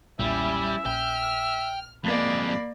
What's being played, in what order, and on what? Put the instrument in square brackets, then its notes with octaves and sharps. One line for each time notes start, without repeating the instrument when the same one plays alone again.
[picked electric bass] E1 B1 A#2 [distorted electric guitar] G3 [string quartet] C#4 E4 [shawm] E5
[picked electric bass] A#1 [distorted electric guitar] G5 [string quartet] F6
[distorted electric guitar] F2 G#3 [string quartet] A#3 D5 [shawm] B5